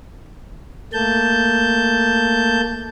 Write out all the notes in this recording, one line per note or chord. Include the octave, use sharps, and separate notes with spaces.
A3 A#3 A5 G6